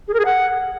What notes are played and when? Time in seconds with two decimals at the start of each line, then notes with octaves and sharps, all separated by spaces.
0.08 G#4
0.14 A#4
0.19 G#4
0.25 F#5